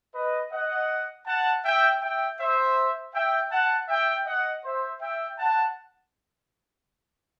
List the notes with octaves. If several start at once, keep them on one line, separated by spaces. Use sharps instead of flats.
B4 D#5
D#5 F#5
F#5 A5
E5 G5
E5 G5
C5 E5
E5 G5
F#5 A5
E5 G5
D#5 F#5
C5 E5
E5 G5
F#5 A5